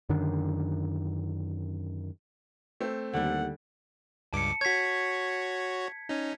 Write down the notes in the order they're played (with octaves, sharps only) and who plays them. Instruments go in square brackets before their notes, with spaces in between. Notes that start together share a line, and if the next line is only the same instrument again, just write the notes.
[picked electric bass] F#2 D3 D#3 D4
[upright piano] A3 C4
[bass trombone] D#2 [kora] D3 G3 [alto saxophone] F#5
[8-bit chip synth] C#2 G2 D6 [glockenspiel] A5 C#7
[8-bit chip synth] F#4 C#5 [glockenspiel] G#6 B6
[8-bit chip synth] C#4 D#4